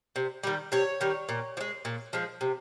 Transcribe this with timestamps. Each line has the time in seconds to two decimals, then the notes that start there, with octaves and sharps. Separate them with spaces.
0.16 C3
0.43 D#3 G3
0.72 C3 C#5
1.01 D#3 G3
1.29 A#2
1.57 F3
1.60 G#3
1.85 A#2
2.13 F3 G#3
2.41 C3